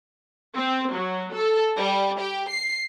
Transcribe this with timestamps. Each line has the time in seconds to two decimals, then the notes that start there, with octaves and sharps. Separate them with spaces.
0.56 C4
0.92 F#3
1.34 A4
1.76 G3
2.19 G4
2.49 C7